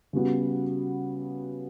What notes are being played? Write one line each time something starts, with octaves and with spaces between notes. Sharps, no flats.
C#3 G3 B3 F#4